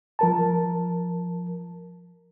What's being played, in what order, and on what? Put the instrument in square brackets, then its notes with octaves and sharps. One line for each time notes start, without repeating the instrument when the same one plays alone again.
[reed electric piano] F3 A#4 A5